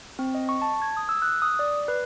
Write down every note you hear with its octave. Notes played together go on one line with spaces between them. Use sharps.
C4
D#5
C#6
A5
G#6
D#6
E6
F#6
D#6
D5
B4